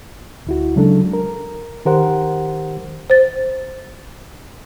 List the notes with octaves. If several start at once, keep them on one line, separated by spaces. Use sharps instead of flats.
D2 E4 F#4
C#3 F#3 G#3 D4 A4
A#4
D#3 G4 A#4 C5 F#5
C5 A6